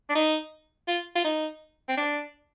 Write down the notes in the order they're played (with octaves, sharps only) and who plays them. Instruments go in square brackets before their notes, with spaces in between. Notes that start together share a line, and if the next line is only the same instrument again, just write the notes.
[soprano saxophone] D4
D#4
F4
F4
D#4
C4
D4